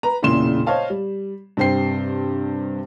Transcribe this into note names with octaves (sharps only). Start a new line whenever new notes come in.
B4 A#5
E1 A#2 C#3 E4 C6 E7
C5 C#5 D#5 F5 A5
G3
G2 C3 C5 G5 C7